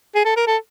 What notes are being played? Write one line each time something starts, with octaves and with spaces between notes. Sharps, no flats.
G#4
A4
A#4
A4